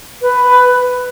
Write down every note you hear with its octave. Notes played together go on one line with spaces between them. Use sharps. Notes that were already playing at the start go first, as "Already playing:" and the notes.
B4